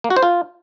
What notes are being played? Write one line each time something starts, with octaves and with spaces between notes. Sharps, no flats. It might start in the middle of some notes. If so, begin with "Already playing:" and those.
A#3
F#4
C5
F4